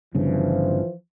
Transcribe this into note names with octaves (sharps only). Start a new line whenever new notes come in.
G1 G2 C#3 E3 F3